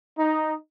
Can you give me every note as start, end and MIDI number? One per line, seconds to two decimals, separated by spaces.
0.18 0.53 63